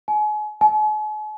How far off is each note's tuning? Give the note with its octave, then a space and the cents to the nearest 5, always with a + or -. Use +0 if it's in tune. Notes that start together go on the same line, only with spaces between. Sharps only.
G#5 +35
G#5 +45